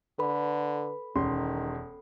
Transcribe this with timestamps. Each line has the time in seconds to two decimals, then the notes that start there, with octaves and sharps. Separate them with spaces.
0.19 D3 A4 B4 B5
1.16 E1 D#3 C#4 C6